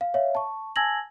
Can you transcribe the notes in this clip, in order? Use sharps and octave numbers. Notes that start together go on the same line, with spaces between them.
F5
C#5 E5 F5
A5 C#6
G#5 A5 E6 G#6 A#6 F#7